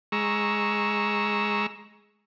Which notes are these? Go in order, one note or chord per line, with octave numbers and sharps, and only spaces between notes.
G#3 A#5 C#6 E6